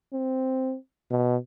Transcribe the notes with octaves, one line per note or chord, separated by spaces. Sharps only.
C4
B2